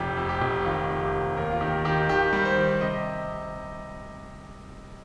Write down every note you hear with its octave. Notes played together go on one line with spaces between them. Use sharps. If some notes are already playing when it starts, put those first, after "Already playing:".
Already playing: F1 F2 G4
F2
G4
F1
D#3 F4
C3
G4
C3
D#2 A#4
F4
D#3 G4
D#3 G4
D#3 G4
G3
C5
D#3
C3 D#5